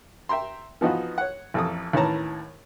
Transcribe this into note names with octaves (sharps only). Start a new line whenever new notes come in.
E5 G5 A#5 C6
E3 F3 B3 D#4 F4 F#4
C#5 F#5
A1 F2 A4 D#6
D#2 A2 E3 C#4 A5 A#5